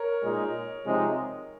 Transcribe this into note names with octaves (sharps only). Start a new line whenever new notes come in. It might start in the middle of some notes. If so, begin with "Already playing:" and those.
Already playing: A#4 C#5
A#2 G#3 D#4
C3 F3 G#3 C4 D#4